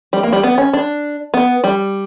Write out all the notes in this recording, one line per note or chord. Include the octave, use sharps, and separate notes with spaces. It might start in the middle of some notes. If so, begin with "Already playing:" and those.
G3
A#3
G3
B3
C#4
D4
B3
G3